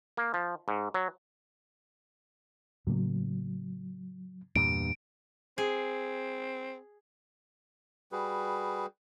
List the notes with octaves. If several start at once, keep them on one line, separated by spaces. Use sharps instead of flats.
A#3
F3
G#2
F#3
A2 C#3 F#3 A#3
E2 G2 A#2 D7
C4 G#4
G3 F#4 G#4 B4